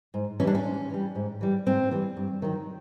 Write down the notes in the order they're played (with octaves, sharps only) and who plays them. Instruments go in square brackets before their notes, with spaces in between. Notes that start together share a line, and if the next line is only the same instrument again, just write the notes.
[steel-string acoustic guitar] G#2
E3 C#4
G3 D4
C#4
G#2
E3 G3
G#2
E3 G3
G#2 C4
E3 G3
G2
D#3 F#3